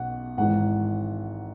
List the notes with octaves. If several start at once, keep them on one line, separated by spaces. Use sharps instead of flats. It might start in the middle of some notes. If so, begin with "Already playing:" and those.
Already playing: B1 B2 F#5
G#1 G#2 E3 F#5